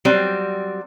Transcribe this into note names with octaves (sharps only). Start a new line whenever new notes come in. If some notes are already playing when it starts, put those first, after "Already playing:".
F#3 G3 C4